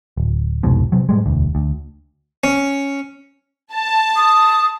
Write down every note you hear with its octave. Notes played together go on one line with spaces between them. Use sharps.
D1
C2 F2 G#2 B2
C3 F#3
A2 G3 G#3
E1 D2
D2
C#4
A5
D#6